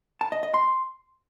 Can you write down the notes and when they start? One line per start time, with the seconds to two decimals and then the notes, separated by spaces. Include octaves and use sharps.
0.21 A5
0.32 D#5
0.43 D#5
0.54 C6